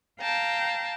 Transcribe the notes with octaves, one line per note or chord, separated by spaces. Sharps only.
F5 G5 A5 A#5